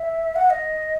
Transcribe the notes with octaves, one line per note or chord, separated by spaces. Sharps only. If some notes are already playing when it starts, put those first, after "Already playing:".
Already playing: E5
F#5
D#5